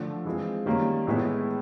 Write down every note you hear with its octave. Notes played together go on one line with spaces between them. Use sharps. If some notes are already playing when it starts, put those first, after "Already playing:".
Already playing: D3 F3 A3
E3 G#3 C4 F4
D#3 G3 A#3 C#4
A2 E3 G#3 B3 E4